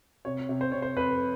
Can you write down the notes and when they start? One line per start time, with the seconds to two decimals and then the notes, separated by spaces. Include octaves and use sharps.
0.25 C3 C#5
0.49 C3
0.61 C5
0.72 C3 C#5
0.82 C5
0.96 F2 B4